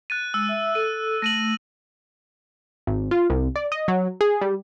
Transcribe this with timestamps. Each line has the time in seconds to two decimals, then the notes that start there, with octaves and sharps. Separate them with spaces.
0.10 F#6 A6 D#7
0.34 G#3 E6
0.49 E5
0.75 A4 D#7
1.22 A3 A#6 D#7 F#7
2.87 G#1
3.11 F4
3.30 C2
3.56 D5
3.72 D#5
3.88 F#3
4.21 G#4
4.41 G3